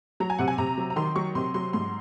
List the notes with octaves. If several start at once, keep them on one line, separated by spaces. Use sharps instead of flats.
F#3 A#5
G#5
C3 F#5
G#5
C3 A#5
F#3
A#5
D#3 C6
F#3 C#6
C3 C6
F#3 C6
G#2 C6